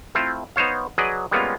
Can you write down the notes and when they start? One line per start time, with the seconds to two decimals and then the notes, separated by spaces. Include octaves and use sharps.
0.15 A3 C4 E4 F4
0.56 B3 D#4 C5 C#5 F5
0.98 F#3 G#4 B4 D5 D#5
1.31 G3 G#3 A#3 B3 C#4 F4